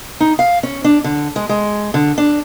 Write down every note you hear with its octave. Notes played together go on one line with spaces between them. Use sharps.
D#4
F5
C#4
D4
D3
G#3
G#3
D3
D4